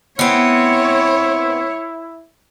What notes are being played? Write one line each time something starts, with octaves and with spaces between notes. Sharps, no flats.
B3 C4 E4 C#5